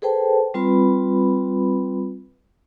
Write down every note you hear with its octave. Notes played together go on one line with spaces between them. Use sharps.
G#4 A4 B4 C5 G5 A5
G3 C4 F4 B4 B5